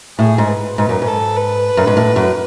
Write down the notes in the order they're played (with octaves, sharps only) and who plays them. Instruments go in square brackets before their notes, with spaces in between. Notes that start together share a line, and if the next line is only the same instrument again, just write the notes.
[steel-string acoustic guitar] A2 [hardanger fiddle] G#4
[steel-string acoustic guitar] G#2
[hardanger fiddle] B4
[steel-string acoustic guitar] G#2 [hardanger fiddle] B4
[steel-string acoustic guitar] F#2
G#2
[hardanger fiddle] A4
B4
[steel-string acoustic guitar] F#2
G#2
A2
F#2